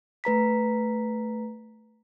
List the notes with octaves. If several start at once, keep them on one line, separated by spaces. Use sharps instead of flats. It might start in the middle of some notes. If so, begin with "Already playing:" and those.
A3 B4 A#5 B6